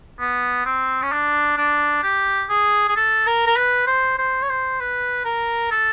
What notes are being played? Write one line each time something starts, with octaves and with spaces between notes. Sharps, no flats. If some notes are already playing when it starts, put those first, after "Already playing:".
B3
C4
C#4
D4
D4
G4
G#4
G#4
A4
A#4
A#4
B4
C5
C5
C#5
C5
B4
A#4
A4